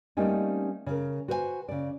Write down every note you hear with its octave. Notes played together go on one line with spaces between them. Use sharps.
G3 A3 A#3 C4 C#4 D#4
C#3 A#4
F#4 B4 C5 D#5 G#5
C#3 D5